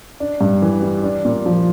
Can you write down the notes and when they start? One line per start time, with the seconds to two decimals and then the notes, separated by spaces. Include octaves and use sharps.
0.20 D4
0.41 G2
0.62 E3
0.82 G3
1.03 D4
1.25 A#2
1.46 F3